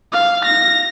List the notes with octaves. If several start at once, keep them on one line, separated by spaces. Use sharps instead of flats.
F5
A#6